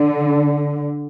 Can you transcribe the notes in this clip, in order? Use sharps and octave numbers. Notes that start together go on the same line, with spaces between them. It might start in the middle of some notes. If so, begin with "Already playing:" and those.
Already playing: D3